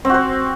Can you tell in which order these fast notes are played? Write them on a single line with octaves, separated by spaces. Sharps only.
C4 F#4 C5